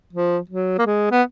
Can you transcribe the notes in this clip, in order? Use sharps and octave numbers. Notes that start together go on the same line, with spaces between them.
F3
F#3
A#3
G#3
B3